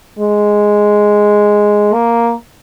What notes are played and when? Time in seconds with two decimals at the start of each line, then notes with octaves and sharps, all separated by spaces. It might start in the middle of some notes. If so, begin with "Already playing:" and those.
0.19 G#3
1.94 A#3